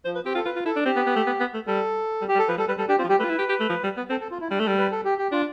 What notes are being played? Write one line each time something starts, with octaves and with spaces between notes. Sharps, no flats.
F3 C5
B4
C4 G4
F4 A4
F4 B4
F4
E4 A4
D4
C4 G4
B3
B3
A3
B3
B3
A3
G3 A4
G3
G4
G3
A4
F3 B4
G3 A4
G3 B4
G3 A4
D4 G4
C4 F4
F3
G3 G4
A3 B4
F4
E4
G4
G4
A3
F3
G3
B3
C4 A4
A4
F4
E4
G3 D4
A3
G3 A4
B4
A4
G4
G4
D4 F4